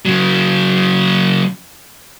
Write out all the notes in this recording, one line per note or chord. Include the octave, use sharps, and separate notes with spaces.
C#3 F#3